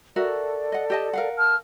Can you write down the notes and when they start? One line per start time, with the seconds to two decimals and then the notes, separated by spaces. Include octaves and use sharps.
0.16 F#4 A4 A#4 D5 E5
0.72 D#5 F#5
0.90 G4 D#5 A5
1.13 A#4 F5 F#5
1.37 A5 E6 F6